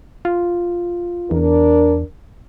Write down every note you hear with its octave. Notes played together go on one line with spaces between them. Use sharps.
F4
E2 D4 A#4